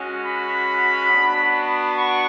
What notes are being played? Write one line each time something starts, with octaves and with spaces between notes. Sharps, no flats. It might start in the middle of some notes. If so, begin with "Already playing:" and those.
Already playing: G#3 C#4 F#4
B5
B3 D4 F#4
C#6